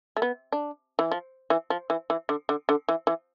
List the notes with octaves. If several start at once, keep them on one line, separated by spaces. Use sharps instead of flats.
A3
B3
D4
E3
F3
E3
F3
E3
E3
D3
D3
D3
E3
E3